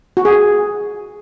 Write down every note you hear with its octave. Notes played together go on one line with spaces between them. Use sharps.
F#4
G#4